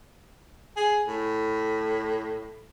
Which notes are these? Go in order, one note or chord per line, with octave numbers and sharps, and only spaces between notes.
G#4
A2